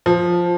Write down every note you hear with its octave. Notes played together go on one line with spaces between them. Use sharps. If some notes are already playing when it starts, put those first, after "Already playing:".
F3